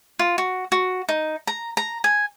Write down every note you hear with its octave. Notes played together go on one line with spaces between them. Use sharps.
F4
F#4
F#4
D#4
A#5
A#5
G#5